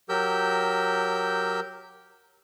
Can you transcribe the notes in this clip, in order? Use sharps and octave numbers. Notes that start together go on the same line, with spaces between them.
F#3 G4 A#4 E6 G6